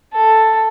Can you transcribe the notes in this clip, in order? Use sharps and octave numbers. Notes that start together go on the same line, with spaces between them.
A4